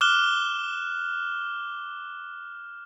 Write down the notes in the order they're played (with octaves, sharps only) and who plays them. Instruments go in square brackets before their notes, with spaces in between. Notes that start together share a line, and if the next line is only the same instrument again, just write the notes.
[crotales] D6 F6 F#6 E7 G7